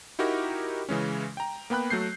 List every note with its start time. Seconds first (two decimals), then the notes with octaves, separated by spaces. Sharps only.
0.19 D#4 E4 F#4 G4 A#4
0.89 C#3 E3 G#3 C#4
1.37 G5 A#5
1.70 A#3 B3 G5 B5 F#6
1.90 F#3 A3 G6 C7